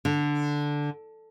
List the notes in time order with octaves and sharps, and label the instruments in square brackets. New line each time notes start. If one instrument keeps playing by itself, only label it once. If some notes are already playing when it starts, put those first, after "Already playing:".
[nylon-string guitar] D3